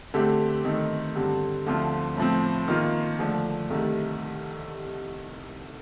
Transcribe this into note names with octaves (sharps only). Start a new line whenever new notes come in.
D3 A3 C4 G4
D#3 A3 C4 D#4
G2 D3 G3 C4
D2 D3 F3 C4 F4
A2 F3 C4
D#3 A#3 F4
D3 F3 A3 D4
C2 C3 D#3 A3